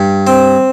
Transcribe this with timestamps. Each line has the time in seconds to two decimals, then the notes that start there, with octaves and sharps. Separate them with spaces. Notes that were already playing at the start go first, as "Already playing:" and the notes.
Already playing: G2
0.27 C4